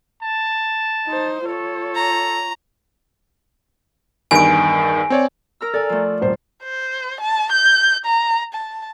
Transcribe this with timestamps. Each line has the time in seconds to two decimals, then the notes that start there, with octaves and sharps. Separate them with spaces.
0.23 A5
1.07 D#4 C5
1.45 F4 A4 C#5
1.95 A#5
4.31 E2 G2 D#3 G#5 D7
5.10 C4 C#5 D5
5.61 A#4 A#5 E6
5.74 A4 D5 G#5
5.89 F3 A3
6.21 D#1 C5
6.64 C5
7.20 A5
7.52 G6
8.05 A#5
8.54 A5